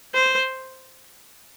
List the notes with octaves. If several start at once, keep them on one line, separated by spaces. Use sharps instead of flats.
C5